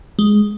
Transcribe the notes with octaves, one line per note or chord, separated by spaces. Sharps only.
G#3